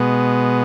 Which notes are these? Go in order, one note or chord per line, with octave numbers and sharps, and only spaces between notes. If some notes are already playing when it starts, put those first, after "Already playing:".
Already playing: B2 G#3 B3